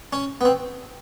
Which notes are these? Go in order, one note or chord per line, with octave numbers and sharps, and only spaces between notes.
C#4
B3
C4